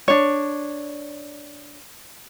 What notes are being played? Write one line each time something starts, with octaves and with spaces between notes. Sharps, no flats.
D4 C#5